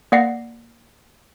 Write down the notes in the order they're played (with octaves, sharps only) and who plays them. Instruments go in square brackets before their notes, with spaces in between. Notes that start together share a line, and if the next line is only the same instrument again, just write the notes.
[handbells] A#3 D5 F#5 A#6 C7